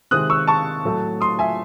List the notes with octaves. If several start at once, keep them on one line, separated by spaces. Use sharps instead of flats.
C3 D#3 G#3 C4 D#6 F#6
C#6 E6
A5 C#6
A2 F#3 A3
C6 D#6
E5 G#5